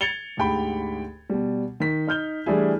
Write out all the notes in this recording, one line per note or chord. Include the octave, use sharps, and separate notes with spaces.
G#6 A6 C#7 F7 G7
D2 G#2 G4 G5 B5
B2 G3
D#3 B6
D#4 F6 G6 G7
E3 G3 A3 D4 E4 G#4